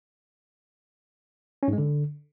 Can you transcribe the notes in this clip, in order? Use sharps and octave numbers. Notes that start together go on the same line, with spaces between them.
C#4
G#2
G#3
D3